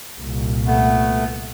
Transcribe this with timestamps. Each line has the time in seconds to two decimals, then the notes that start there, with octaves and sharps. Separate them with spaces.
0.16 C2 A#2
0.67 A3 B3